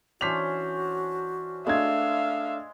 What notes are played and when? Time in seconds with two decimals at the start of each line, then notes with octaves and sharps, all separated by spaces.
0.21 E3 C#4 D4 F#4 C5 B6 F7
1.67 G#3 A3 D4 E5 F5 G#6